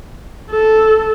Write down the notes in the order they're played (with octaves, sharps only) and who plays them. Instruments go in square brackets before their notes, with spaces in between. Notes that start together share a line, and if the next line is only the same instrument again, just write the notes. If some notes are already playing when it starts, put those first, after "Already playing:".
[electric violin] A4